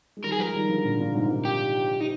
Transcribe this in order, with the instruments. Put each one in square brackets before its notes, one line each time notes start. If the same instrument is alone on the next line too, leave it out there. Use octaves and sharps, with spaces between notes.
[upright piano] G#3
[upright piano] D#3 G3 [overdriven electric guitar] A#4
[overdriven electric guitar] G#4
[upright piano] F3 G#3 [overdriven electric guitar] A#4
[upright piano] D#3 G3
D3 F3
A#2 D3
A#2 D3
G#2 C3
G#2 C3
[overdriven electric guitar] G4
D#4